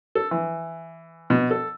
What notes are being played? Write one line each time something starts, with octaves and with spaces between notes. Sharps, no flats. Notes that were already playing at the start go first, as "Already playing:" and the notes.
A4
E3
B2
A4